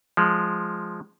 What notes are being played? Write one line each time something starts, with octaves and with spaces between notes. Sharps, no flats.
F3 G#3